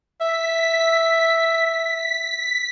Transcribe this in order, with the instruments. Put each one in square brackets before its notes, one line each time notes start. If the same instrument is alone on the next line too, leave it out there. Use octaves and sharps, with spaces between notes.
[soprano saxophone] E5 [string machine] B6